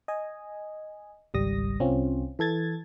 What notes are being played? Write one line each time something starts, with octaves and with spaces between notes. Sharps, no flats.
D#5 G#5
G#1 C#2 G3 D#6 A#6
C2 C4 C#4 F4
E3 A4 G#6 A6